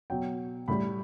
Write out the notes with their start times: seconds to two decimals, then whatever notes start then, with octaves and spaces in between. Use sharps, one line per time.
0.10 B2 F#3 G5
0.68 A2 G3 B5